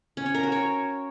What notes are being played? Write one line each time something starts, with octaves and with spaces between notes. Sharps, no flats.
C#4
C#5
A#4
F#4
C#5